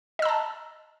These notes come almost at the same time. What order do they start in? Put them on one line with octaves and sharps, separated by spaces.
D#5 E6 A#5 A5